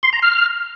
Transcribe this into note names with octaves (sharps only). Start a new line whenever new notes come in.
C6
A#5
F6